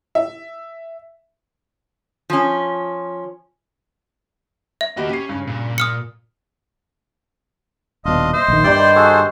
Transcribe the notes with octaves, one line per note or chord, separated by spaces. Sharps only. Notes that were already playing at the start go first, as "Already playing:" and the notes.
E5
F3 C#4
E5
A#3 F#4 G4 D#5 B5
C#4 G4 C7
G2 C#3
A#2
D#6 F6 C#7
D#1 B2 D4 D#5 F5 C6
C5 D#5 E5
A#1 D#3
G2 D#3 G3 E4 D5 G5 C6
F#4 G#4 A4 C#5